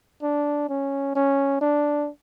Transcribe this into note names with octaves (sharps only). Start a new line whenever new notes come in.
D4
C#4
C#4
D4